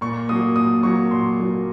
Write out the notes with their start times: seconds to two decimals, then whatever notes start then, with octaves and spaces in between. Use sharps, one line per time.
0.01 A#2 C#6
0.29 F#3 A#3 D#6
0.56 A#2 D#6
0.83 F#3 A#3 C#6
1.11 A#2 C6
1.39 F#3 A#3